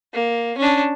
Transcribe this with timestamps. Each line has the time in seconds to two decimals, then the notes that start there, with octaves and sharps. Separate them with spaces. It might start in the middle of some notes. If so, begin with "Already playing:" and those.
0.13 A#3
0.58 C#4 D4